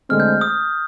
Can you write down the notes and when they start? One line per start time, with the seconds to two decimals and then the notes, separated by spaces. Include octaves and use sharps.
0.09 D2 D3 G#3 C4 F6
0.20 G6
0.41 D#6